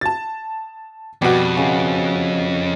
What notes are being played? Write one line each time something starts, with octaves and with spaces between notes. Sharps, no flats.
A5 A6
F2 B2 G3 F#4
C#3 D#5